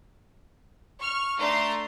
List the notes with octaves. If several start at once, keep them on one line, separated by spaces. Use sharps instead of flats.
C#6 F6
A3 D4 A#5 C6